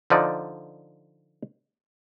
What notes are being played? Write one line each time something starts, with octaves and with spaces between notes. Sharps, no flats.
D3 F3 D#4 D5